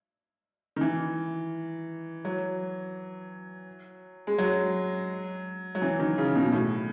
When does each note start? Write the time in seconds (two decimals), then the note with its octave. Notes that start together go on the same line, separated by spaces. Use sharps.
0.76 D#3
0.81 E3
2.25 F#3
4.27 G#3
4.38 F#3
5.75 F#3
5.82 E3
5.99 D#3
6.18 C#3
6.35 B2
6.46 B2
6.52 A2